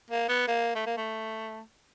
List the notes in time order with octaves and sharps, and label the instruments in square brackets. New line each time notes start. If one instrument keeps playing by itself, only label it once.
[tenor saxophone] A#3
B3
A#3
A3
A#3
A3